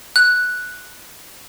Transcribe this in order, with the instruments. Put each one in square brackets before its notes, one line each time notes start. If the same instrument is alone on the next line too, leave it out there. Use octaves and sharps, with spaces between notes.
[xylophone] F#6